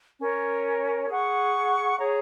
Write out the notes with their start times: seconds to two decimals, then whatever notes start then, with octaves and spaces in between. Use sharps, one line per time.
0.20 C#4 A#4 C#5
1.09 G#4 F#5 C#6
1.98 G#4 C#5 A#5